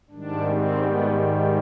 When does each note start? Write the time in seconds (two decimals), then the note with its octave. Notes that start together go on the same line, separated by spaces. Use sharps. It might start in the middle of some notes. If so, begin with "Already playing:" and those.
0.10 G#2 D#3 G3 D4
0.44 C4
0.78 B3